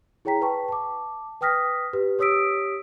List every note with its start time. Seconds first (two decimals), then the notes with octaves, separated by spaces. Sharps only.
0.25 E4 G#4 C#5 G5 A#5 B6
0.41 B4 G5 A5 C#6
0.69 A5 D6
1.41 B4 G5 D#6 F6 A#6 B6
1.93 G4 B4
2.19 G4 C#5 D#6 E6 B6 D7